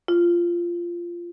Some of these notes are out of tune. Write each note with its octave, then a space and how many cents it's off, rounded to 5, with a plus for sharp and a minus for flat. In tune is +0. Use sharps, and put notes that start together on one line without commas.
F4 -15